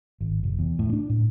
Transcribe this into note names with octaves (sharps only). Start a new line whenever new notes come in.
G#1
F1
E2
A2
D4
A2